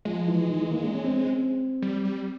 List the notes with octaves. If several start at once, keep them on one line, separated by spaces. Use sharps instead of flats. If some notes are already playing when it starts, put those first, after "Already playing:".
F3 G#3
E3
D#3
E3
A#3
D4
C#4
C4
C#4
C4
G3
G3